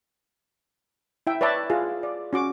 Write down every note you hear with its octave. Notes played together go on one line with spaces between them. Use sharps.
E4 E5 G5
B4 C#5 D5 E5 A5
F4 G#4
D5
C#4 F#4 D6